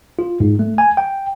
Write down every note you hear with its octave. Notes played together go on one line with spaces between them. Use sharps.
F4
G#2
A3
G#5
G5